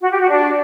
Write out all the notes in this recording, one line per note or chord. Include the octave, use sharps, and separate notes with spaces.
F#4
G4
F#4
D4